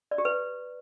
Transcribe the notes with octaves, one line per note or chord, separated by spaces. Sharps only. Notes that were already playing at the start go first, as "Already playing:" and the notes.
D5
G4
B4